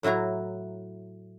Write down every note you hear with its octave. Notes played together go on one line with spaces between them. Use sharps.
A2 F#3 E4 F#4 A#5